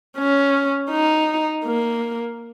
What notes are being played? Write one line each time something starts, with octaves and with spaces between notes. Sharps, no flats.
C#4
D#4
A#3